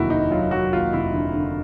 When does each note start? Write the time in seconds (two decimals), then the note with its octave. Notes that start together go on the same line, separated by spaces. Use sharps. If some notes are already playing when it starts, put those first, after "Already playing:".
Already playing: F1 D#2 D3 F#3 E4 F#4
0.10 F1 D#4
0.31 F#3 F4
0.51 F#3 F#4
0.73 D#2 F4
0.93 F1 E4
1.13 D3
1.34 D3